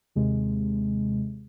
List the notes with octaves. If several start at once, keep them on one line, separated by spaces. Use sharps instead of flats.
D#2 C3 G#3